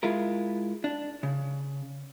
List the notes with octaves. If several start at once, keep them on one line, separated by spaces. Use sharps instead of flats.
G#3 E4 F4 A#4
D4
C#3